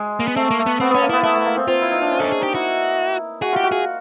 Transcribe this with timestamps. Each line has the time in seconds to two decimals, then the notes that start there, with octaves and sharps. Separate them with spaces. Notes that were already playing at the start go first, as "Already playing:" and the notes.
Already playing: G#3
0.20 A#3
0.28 B3
0.36 A3 C4
0.51 A#3
0.59 A3
0.66 B3
0.80 B3 C4
0.91 B3 C#4
1.02 A#3
1.10 B3 E4
1.24 A3 E4
1.35 A3
1.46 A#3
1.57 C4
1.68 C4 F4
1.82 E4
1.92 D#4
2.01 D4
2.11 C#4
2.20 D#4 A4
2.26 D4
2.32 G#4
2.41 D#4 G4
2.55 E4 F#4
3.42 F#4 G#4
3.53 F4 G4
3.63 F#4
3.72 G#4